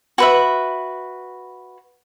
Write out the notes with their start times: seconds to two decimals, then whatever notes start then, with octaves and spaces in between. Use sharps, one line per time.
0.18 F#4 B4 E5